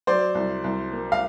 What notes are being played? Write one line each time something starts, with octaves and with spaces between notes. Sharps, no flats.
F#3 C5 D5
C2
C2
A#3
F5